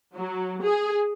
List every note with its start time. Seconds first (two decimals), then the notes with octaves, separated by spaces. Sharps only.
0.15 F#3
0.62 G#4